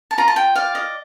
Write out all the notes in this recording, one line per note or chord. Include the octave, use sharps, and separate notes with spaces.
A5
F4 A#5
A5
G5
D5 F5
D#5